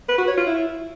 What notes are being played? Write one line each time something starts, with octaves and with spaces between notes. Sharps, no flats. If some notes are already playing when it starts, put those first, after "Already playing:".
B4
F#4
C#5
F4
E4